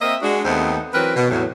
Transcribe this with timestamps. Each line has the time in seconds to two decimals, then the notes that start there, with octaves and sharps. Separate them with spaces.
0.01 A#3 C4 A#4 D#5 E5
0.22 G#3 D4 F#4
0.45 D#2 A3 B3 C4 D#4 C5
0.93 E3 F#3 C4 A#4 B4
1.16 B2
1.31 E2 A2 F#3